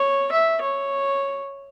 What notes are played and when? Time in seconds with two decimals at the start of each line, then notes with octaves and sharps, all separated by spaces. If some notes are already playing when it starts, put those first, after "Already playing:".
Already playing: C#5
0.32 E5
0.61 C#5